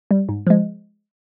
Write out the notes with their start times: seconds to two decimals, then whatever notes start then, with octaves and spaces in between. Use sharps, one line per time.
0.11 G3
0.29 G#2
0.47 F3 G#3